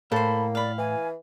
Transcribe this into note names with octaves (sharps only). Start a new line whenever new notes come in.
A2 A#3 A4 C5 B5
D5 F5 B5
E3 G#5